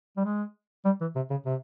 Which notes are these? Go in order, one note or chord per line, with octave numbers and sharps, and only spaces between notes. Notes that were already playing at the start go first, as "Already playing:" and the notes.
G3
G#3
G3
E3
C3
C#3
C3